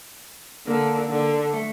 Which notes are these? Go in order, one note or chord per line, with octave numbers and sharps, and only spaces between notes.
D3 A#3
D3
A3